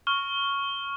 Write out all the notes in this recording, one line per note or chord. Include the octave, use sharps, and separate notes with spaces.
C#6 F6 G7